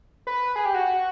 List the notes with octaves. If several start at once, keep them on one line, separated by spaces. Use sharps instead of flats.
B4
G#4
G4
F#4